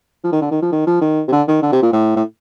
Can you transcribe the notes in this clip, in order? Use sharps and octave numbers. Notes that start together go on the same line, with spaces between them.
F3
D#3
D3
D#3
F3
D#3
F3
D#3
C3
D3
D#3
D3
C3
A#2
A2
A2